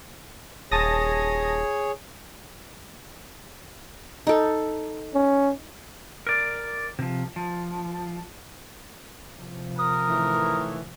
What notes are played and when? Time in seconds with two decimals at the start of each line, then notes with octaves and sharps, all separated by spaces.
0.71 D#1 G#4 C#5 A5 D#6 A#6
4.27 D#4 A4
5.14 C#4
6.27 A#4 D5
6.99 C3 F3
7.36 F3
9.38 C3 F3
9.78 A#4 D#6
10.08 A2 D#3 E3